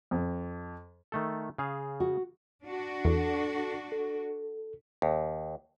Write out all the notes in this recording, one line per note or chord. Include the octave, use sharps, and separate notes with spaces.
F2
D#3 A3 A4
C#3 G#4 F5
F#4
D4 F#4
E2 A4
A4
D#2